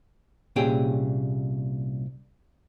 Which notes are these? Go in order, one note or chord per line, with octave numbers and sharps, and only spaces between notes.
C2 A#2 C#4 G4 G#4 G5